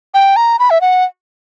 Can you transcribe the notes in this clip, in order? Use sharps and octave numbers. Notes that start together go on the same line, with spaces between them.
G5
A#5
B5
E5
F#5